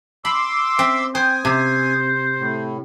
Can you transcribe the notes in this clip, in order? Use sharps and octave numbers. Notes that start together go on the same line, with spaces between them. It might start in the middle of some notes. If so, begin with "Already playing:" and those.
B5 C6 D6 E6
C4 E5
C5 G5 G#5 D#6
C3 C5
A2